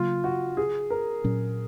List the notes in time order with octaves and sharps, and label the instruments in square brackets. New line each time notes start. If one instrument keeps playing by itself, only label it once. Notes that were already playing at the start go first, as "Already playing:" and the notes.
Already playing: [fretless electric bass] C#3 F#3 A#3 [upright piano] F4
[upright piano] F#4
G#4
A#4
[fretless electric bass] A#2 F#3 C#4